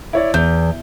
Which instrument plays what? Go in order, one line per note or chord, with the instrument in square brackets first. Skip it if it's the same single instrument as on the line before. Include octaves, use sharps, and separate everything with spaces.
[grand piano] E4 C#5 D5
[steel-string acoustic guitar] E2 [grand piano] G6